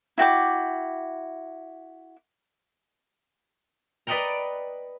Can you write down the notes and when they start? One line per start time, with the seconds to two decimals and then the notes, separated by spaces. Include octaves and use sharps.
0.18 E4 F#4 G5 D6
4.07 B4 D5 D#5 F#5 G5 A#5